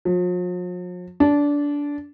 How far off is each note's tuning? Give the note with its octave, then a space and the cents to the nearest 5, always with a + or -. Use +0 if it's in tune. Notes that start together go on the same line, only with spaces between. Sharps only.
F3 +45
D4 -20